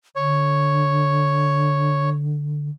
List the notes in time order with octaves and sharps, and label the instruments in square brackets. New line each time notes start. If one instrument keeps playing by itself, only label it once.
[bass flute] D3 [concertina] C#5